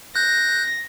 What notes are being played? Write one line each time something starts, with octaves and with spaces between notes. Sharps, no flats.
F#6 G6 A#6